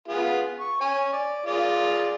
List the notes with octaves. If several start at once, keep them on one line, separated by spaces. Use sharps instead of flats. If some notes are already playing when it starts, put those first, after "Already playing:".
B3 F4 G#4
C#6
C#5 G#5
D5
F4 G#4 D5